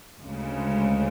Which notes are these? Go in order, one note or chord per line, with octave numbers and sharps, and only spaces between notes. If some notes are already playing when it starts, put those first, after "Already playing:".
D2 C#3 G#3